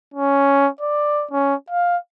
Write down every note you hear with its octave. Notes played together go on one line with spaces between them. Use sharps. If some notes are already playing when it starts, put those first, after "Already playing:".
C#4
D5
C#4
F5